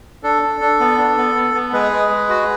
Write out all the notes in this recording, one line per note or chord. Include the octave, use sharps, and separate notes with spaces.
D4 A4
D4
D4
B3
D4
B3
B3
B3
G#3 G#4 B4
G#3
G#3
F#4